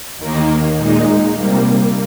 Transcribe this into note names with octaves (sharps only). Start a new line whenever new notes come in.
D#2 D#3 A#3
A#2 G#3 D#4
C3 G3 A#3